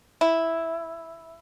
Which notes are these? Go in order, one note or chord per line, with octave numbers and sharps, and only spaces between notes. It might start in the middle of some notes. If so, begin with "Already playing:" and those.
E4